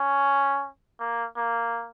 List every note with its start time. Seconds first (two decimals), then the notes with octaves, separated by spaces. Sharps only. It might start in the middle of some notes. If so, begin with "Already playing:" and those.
Already playing: C#4
1.00 A#3
1.37 A#3